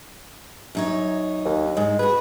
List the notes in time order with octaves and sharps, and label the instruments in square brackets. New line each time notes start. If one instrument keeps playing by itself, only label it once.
[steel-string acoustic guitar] F#2 D#4 C#5
[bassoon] D#2
[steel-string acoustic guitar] G#2 [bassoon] G#3
[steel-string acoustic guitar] F#4 G#4 [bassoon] B4